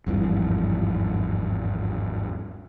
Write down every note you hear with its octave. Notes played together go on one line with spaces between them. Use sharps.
G#1 E2 G2 F3